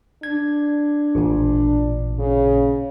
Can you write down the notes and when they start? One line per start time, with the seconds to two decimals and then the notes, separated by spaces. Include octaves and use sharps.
0.23 D4 G#6
1.15 A1 A#2
2.19 C#3